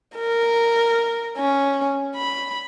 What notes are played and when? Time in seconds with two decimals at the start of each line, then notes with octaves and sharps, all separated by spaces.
0.16 A#4
1.37 C#4
2.16 B5